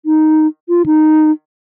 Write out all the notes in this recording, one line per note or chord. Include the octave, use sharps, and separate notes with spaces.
D#4
F4
D#4